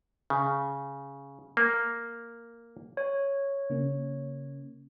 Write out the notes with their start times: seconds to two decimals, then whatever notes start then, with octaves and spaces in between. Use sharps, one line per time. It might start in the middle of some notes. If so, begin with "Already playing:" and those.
0.30 C#3
1.57 A#3
2.97 C#5
3.70 C#3 A#3 C#4